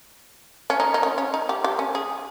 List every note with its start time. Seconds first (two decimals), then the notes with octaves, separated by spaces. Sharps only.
0.70 C#4
0.80 D#4
0.94 D#4
1.03 C#4
1.18 C#4
1.34 D#4
1.49 G4
1.64 G4
1.79 C#4
1.95 G#4